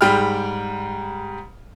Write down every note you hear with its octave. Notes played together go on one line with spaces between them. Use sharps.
G#2 G3 G5 B5 F6